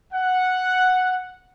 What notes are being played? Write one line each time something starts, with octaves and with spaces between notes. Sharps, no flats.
F#5